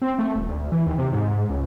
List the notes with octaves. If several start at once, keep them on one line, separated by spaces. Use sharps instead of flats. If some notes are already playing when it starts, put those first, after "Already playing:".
C4
A3
D#1
D2
E3
D#2
C3
G#2
C#2